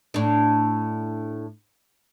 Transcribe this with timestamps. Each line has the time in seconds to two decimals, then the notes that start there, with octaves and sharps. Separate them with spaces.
0.14 A2 D4